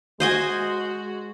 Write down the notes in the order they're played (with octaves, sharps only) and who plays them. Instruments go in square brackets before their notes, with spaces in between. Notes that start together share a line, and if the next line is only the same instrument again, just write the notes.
[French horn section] G#3 [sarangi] F#4 [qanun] C5 D#5 G#5